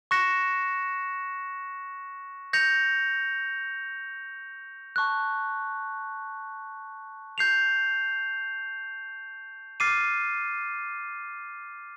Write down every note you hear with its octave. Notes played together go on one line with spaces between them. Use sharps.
C#6 F#6 A#6 C#7 E7
G6 A#6 C#7 F7
A5 C#6 F#6
G6 C7 F7
D6 F6 A6 C7 D#7